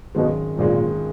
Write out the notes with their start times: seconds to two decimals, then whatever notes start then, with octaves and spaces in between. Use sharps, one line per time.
0.15 G#1 F#2 B2 D#3 G#3
0.57 G#1 F#2 A#2 D#3 G#3